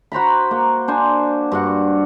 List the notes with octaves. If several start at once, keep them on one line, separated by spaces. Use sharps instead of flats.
F#4 C5 A#5 B5
A#3
D4 C5 G#5
G2 F#4 F#5